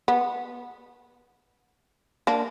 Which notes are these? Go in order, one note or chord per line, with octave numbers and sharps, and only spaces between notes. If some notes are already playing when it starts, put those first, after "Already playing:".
B3
A#3 D4